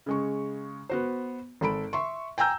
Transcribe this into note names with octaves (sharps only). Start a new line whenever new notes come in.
C#3 G#3 C#6
B3 F#4 C5
G#1 A4 B5 D7
E5 C6 C#6
G5 G#5 A#5 E6 G6